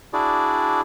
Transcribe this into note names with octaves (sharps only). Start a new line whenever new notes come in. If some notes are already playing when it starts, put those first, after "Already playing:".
D4 E4 F#4 G#4 D5